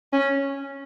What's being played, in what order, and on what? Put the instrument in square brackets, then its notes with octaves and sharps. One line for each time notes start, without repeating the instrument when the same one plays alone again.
[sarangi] C#4